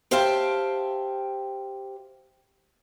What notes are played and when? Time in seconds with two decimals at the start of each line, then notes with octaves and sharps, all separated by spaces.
0.11 G4 C5 E5 F5 G5 A5